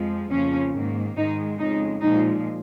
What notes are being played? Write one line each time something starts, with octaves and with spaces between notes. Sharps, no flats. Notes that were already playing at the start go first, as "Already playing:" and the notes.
Already playing: F2 F3 G#3
F2 C#3 F3 A#3 C#4
G#2 D#3 A#3
G#2 D#3 G#3 D#4
F2 C#3 G#3 D#4
A#2 F3 G#3 D#4